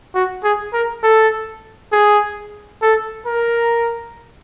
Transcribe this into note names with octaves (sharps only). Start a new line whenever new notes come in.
F#4
G#4
A#4
A4
G#4
A4
A#4